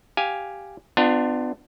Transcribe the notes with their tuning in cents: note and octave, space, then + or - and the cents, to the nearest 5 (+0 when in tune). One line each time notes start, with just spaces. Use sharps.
G4 +0 F5 +0 G#5 +0
B3 +35 D4 +20 F4 +0